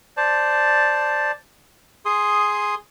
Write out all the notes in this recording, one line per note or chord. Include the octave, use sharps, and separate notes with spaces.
C5 D5 A5
G#4 C6 D#6